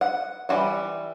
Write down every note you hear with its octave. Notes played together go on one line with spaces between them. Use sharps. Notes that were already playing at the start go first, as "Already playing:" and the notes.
F#5
E3 G3 F#4 F#5